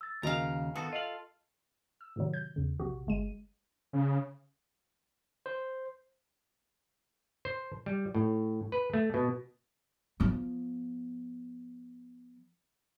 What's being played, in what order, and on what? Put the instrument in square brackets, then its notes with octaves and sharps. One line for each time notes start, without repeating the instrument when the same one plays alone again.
[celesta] E6 A6
[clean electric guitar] D#2 C#3 [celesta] F#4 A#4 D#5 [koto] F5 A#5
[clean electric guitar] D#3 B3 F#4 [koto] A4
[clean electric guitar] F4 F5 [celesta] D#5 F#7
[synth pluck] E6
A2 C3 D#3 F#3
G6
E2 C#3
A#1 C3 F#4
G1 G#3 D#7
[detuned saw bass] C#3
[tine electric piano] C5
[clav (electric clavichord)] C5
G3
A2
B4
A3
B2
[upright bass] F3 B3